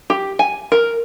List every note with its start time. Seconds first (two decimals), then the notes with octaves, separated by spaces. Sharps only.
0.10 G4
0.39 G#5
0.72 A#4